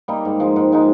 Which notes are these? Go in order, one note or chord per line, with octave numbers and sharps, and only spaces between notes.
G3 A#3 D#4
G#2
F3 G#3 D#4
G#2
F3 G#3 D#4